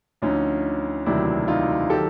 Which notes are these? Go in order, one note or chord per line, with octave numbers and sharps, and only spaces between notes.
D2 D3 F3 C#4 D#4
E1 D2 C3 D#3 F#3 D4 E4
D#4 F4
D#3 F#3 G4 A4